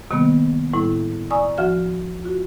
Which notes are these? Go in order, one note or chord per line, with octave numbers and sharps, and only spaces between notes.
C3 D#3 G3 A#3 B3
A2 G3 E4
D5 G#5 A#5 C#6 D#6 E6
D2 F3 F#4 E5 F6
F4 F#4